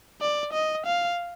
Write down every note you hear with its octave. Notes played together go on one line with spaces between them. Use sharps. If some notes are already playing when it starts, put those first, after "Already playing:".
D5
D#5
F5